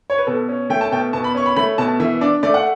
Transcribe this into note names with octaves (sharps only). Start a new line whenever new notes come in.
C#5
B4
B2 A4
C#4
A3 G5
A5
B2 G5
B2 A5
B5
C#4 C#6
B5
A3 B5
B2 A5
E3 E5
D4 D5
A3 D5
F#5